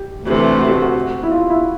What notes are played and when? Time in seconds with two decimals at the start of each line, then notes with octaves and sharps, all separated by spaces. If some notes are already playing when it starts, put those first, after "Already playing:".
Already playing: G4
0.23 D2 C3 E3 A3
0.59 F#4
0.70 G4
0.81 F#4
1.23 E4
1.32 F4
1.50 E4